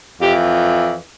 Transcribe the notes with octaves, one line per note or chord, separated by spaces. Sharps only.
F2 E3 G4